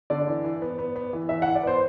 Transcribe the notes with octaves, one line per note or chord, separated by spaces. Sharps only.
D3 D5
E3
E3
B3
B3
B3
E3
E3 E5
E3 F#5
D5
B3 C5